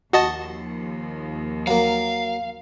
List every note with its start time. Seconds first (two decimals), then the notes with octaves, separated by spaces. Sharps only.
0.13 D#2 F3 F#4 D#5 A5
1.67 F#3 A#3 F5